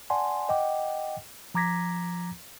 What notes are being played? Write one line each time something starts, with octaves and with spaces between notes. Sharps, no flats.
D5 F#5 G#5 A5 C6
D#5 F#5 G5 D6
F3 A#5 D6 G#6 A#6 B6